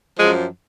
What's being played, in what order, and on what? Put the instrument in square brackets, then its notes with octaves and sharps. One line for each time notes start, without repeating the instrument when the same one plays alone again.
[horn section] F#2 F3 G#3